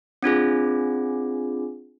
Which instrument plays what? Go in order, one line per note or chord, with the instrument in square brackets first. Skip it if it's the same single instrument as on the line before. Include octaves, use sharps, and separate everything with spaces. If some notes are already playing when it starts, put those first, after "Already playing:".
[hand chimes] C4 D4 F4 G#4